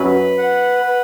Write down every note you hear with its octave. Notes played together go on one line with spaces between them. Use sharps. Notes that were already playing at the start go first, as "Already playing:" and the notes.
Already playing: F#2 F#3 B4
F#5
B4